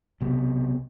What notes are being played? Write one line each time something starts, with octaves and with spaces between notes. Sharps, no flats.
B1 C3 B3